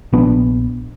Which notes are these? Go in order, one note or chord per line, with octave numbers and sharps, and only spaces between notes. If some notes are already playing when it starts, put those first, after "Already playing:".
A#1 B3 D4